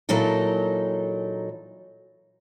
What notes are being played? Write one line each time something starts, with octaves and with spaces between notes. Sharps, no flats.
A#2 E3 F#3 D#4 A4 A#4